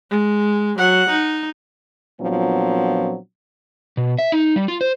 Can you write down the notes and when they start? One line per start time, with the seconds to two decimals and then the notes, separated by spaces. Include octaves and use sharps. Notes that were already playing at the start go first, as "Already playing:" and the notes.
0.11 G#3
0.78 F#3 F#5
1.10 D#4
2.20 A#2 F3 F#3 B3 C4 D4
3.97 B2
4.18 E5
4.32 D#4
4.56 G3
4.68 F4
4.81 C5